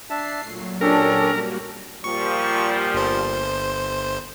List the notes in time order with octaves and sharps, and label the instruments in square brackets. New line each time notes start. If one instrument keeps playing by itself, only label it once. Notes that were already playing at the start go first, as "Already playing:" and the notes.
[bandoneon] D4 E5 A5 [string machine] C7
[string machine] A#2 F#3 [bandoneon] A3
[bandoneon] C#4 G4 A4 [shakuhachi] D4 [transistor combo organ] A#4
[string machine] G3 A#3 F#4
[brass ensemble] A#2 F3 G3 [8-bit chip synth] C#6
[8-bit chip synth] G1 C5